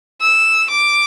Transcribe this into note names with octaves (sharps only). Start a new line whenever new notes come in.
E6
D6